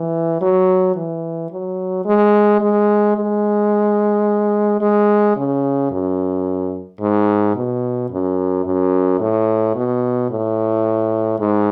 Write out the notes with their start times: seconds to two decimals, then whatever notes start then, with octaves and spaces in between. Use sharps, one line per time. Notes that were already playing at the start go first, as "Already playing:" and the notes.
Already playing: E3
0.41 F#3
0.96 E3
1.51 F#3
2.05 G#3
2.61 G#3
3.16 G#3
4.81 G#3
5.36 C#3
5.91 F#2
7.01 G#2
7.56 B2
8.11 F#2
8.65 F#2
9.20 A2
9.76 B2
10.31 A2
11.40 G#2